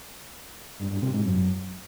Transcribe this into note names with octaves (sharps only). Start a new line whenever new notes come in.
G2
G2
C3
G#2
F#2